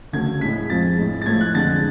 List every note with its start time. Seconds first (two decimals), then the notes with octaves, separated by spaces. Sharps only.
0.13 D2 C#3 F#3 A3 G#6
0.41 A2 G#3 B6
0.69 F2 F3 G#3 A6
0.98 A2 G#3
1.21 A6
1.26 A2 F3 A3 G#6
1.41 F#6
1.54 F2 D3 G#3 A6